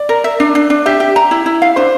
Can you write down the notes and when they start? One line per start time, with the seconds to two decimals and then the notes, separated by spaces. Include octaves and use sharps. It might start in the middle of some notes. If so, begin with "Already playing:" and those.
Already playing: D5
0.09 A#4
0.24 E5
0.40 D4
0.55 D4
0.70 D4
0.86 G4 E5
1.00 G4
1.16 A#5
1.31 E4
1.46 E4
1.62 F5
1.76 D4 C5